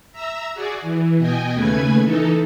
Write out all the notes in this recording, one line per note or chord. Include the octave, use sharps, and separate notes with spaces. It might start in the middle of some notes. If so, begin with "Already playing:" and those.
E5 A#5 E6
F#4 G#4 D5
E3
B2 D#5 G5 G#5
D#2 C#3 A3 B4 G#5 G#6
E3 D#4 A4